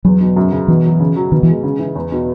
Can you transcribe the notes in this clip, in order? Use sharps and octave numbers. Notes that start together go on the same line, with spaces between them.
E2 F#3
B2
F#2
C#3
B2 E3
F#3
C#3
F#3
B2 D#3
E3
G#3
C#3
E3
E2
B2